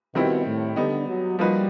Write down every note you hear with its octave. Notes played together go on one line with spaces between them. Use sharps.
B2 D#3 G3 C4 E4
A2
D3 G3 B3 D#4
F#3
F3 G3 A#3 D#4 F#4 B4